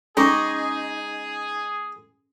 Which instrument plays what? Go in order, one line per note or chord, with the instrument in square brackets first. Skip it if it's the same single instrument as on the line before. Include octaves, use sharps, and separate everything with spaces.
[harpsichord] G#3 [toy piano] C#4 C#6 D6 [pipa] D#4 [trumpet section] G#4